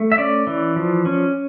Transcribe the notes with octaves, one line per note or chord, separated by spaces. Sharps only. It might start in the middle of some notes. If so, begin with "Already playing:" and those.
Already playing: A3
E5
C#4 D5
E3
F3
C#4